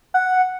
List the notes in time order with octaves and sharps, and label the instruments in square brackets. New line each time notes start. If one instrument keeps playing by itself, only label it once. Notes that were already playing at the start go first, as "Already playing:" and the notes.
[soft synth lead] F#5